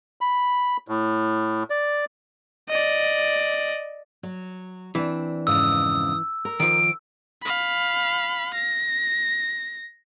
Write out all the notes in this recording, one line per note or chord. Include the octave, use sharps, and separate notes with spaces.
B5
A2
D5
D5 D#5
F#3
E3 C4 D4
F2 G#2 C#3 D#6 E6
A#4
D#3 F3 D7
F5 B5
A#6